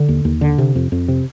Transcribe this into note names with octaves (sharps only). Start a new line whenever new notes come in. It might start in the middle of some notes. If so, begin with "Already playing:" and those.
Already playing: D3
D#2
D#2
D3
C3
F2
F2
C3